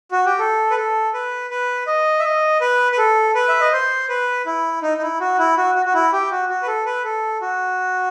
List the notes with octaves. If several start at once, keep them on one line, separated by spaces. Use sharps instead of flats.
F#4
G4
A4
B4
A4
B4
B4
D#5
E5
D#5
B4
B4
A4
B4
E5
D#5
C5
B4
E4
D#4
D#4
E4
F#4
E4
F#4
F#4
F#4
E4
G4
F#4
F#4
B4
A4
B4
A4
F#4